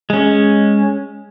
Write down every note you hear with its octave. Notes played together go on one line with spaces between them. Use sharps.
G#3 C#4